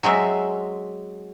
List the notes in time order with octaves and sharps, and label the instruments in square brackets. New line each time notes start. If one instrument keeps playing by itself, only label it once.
[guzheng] F#3 G#3 C4 E5